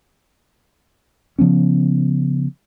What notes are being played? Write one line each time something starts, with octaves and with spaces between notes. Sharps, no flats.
C#3 F3 B3 C#4